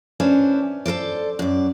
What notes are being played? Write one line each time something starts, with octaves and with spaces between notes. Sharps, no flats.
C#4 D4 E4 B4 C5
A4 A#4 C5 D5
F#2 D5